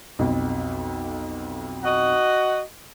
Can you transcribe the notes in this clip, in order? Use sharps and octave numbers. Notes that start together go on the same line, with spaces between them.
B1 F2
F#4 D#5